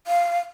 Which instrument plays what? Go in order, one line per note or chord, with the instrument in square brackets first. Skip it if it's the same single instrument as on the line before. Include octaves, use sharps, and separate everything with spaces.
[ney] F5